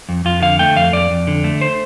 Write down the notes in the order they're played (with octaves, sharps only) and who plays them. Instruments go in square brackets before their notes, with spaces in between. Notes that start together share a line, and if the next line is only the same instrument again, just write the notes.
[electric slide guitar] F2
F2 F4
D3 F5
A3 G5
F2 F5
F2 D5
F2
D3
A3
C5